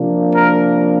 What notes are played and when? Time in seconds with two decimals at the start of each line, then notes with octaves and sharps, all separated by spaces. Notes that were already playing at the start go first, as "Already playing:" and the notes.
Already playing: C3 F3 A#3 D4
0.33 A#4